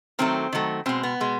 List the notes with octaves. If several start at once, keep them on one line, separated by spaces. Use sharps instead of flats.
D#3 F#3 A3 C4
D#3 F#3 A3
B2 G#3 C4
B3
B2 G#3